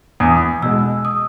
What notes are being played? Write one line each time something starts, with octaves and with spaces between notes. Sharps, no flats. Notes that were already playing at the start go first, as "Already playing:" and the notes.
E2 D#6
B2 G#3 E6
D#6